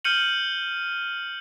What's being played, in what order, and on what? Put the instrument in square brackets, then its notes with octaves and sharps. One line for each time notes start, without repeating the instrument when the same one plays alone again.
[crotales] F6 G6 C#7 D#7 F#7